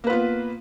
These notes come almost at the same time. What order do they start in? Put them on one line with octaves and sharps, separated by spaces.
A#3 B4 F4 B3